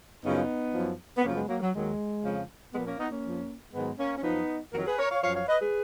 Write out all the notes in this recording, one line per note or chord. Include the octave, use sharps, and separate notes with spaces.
F#2 C#3 F3 B3 D#4
F#2 F3
B3
F#2 C#3 F3 A#3 C#4
G#3 B3
F#3 A#3
F#3
D#2 D#3 F#3 G#3
F2 C#3 F3
A#2 F3 G#3 B3
A#3 C#4
B3 D#4
A#3 C#4
F2 F3
G#2 D#3 F#3 G#3 B3
A#3 C#4
C#4
F#2 F3 B3 D#4
F2 D#3 F#3 F#4 A#4
G#4 B4
A#4 C#5
C#5 F5
F#2 F3 C#5 F5
C#5 F5
B4 D#5
G#4 B4